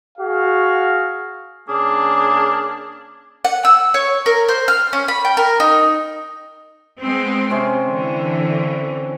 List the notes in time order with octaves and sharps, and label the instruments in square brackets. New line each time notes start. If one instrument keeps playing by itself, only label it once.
[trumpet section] F#4 G#4 F5
[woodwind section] C#3 A#3 D4 G#4
[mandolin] F#5
E6
C#5
A#4
C5
F6
C#4
B5
G5
A#4
D#4
[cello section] G#3 B3 C4
[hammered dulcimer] C3 C#4
[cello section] D3 E3